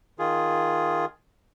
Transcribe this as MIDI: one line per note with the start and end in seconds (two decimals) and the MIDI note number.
0.19 1.05 51
0.19 1.05 65
0.19 1.05 68